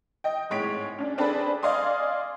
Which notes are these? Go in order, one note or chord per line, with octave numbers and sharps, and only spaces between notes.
D#5 G5
G#1 A2 G#3 C#5 B6 D7
C#4 D4
C4 D4 G#4 A4 B4
D5 D#5 F5 G#5 C6 D#6